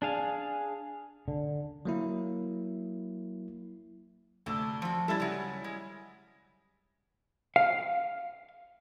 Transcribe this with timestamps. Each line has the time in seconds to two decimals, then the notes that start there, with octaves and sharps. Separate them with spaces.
0.02 D4 G#4 F5
1.28 D3
1.85 F#3 A#3 E4
4.46 D2 C3 A4
4.82 F3 F#4
5.08 G3 C#4 E4 A4 A6
5.20 C#3 F#3
5.64 G#3
7.56 F5